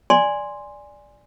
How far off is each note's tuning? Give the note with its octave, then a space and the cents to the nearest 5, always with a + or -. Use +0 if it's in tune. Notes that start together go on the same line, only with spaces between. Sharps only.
D5 +0 G#5 -5 C6 +0